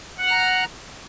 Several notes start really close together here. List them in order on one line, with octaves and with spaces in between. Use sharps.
F#5 F#6 F6 A#5